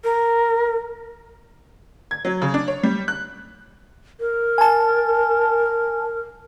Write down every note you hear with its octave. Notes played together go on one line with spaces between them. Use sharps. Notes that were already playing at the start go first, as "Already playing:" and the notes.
A#4
G#6
F#3
C#3
D4
C#5
G3
F#6
A#4
G#5 A5